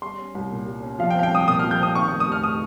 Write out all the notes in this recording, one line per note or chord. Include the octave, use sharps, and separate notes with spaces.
G3 C6
C#4
C2
A#2
G3
C#4
F3 F5
G5
C4 F5
G5
C2 D#6
A#2 D#6
F3 F6
G6
C4 D#6
D#3 C#6
F1 C#6
D#6
F1 F6
D#6